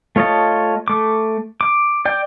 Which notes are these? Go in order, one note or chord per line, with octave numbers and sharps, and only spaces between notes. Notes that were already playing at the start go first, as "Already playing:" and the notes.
A3 F4 C#5 D#5 A5
A3 D6
D6
D5 G5